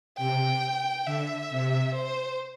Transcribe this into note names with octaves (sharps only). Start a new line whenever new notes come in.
C3 G5
D3 E5
C3
C5